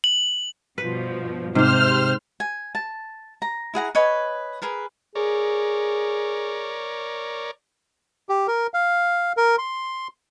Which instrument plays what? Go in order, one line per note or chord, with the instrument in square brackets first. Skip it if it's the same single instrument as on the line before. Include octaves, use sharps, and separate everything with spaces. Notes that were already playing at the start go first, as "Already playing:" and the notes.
[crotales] F#7
[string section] G2 B2 F3 [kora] B4
[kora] G#2 F5 [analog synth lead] C3 [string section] C5 F6
[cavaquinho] G#5
A5
A#5
E4 G#4 F#5 A#5
B4 C#5 D#5 G#5
G#4 A#4 B4
[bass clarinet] G#4 [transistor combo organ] A#4 C#5 D5
[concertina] G4
A#4
F5
A#4
C6